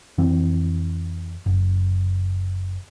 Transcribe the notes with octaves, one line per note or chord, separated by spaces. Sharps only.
F2 E3 C4
F#1